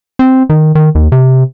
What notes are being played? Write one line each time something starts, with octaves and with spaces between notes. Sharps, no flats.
C4
D#3
D#3
D#2
C3